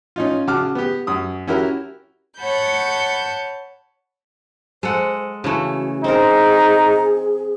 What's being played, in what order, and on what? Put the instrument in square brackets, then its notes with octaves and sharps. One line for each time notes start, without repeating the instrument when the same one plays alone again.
[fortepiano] C#4 D#4 F4
C#3 F#4 A5 D6 F6
B3 G4
F#2 D#6
C#4 E4 F#4 G4 A#4
[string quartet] C#5 F#5 A5 B5 G6
[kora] G#3 A4 F#5 [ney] C5
[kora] C#3 E3 A3 [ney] F#4
[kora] C4 A#4 [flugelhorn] D#4 [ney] G#4